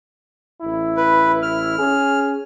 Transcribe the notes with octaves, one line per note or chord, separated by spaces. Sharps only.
A1 E4
B4
F6
C#4 G#4